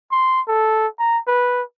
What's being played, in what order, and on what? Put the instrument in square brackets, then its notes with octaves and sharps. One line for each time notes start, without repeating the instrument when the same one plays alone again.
[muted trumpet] C6
A4
A#5
B4